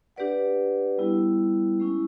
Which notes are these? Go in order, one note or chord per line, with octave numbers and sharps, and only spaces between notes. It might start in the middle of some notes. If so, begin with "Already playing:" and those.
D4 G4 B4 D5 F#5
G3 B3 E4
G#3 C#4 E4